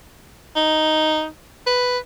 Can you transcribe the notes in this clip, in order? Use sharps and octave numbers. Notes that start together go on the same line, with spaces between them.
D#4
B4